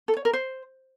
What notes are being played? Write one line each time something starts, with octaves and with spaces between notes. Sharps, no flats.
A4
C#5
A#4
C5